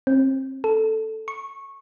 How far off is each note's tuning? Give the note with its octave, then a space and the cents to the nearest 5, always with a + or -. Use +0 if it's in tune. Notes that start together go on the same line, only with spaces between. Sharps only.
C4 +30
A4 +0
C#6 -15